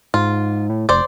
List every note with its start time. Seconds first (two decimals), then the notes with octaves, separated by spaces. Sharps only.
0.14 G#2 F4
0.70 A2
0.89 F1 C5 D5